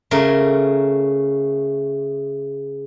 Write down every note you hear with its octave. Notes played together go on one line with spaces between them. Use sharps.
C#3 A3 A#4